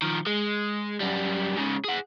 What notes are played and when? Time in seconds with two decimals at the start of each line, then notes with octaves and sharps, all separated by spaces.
0.02 D#3 F3
0.26 G#3
1.00 F#2 G3
1.56 G#2 C#3
1.84 G#4 F#5